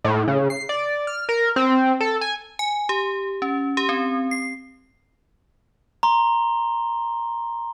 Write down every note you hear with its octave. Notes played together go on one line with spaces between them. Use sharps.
A2
C#3
C7
D5
F6
A#4
C4
A4
G#5
G#5
G4
C#4
G4
C4
C7
A#5 C6 G7